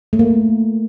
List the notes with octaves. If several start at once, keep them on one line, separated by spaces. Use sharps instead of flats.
A3
A#3